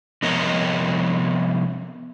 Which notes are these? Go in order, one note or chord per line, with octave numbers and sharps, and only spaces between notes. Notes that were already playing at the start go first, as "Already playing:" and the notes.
C3 F3 B3 A#4 C#5 D#5